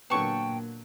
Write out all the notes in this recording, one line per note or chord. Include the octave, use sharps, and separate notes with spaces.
A#2 D3 F#3 A#3 B3 G5 A5 C#6